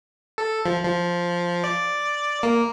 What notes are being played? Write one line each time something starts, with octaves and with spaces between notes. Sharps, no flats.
A4
F3
F3
D5
A#3